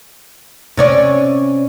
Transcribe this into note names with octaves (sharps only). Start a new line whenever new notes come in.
C3 C#4 D5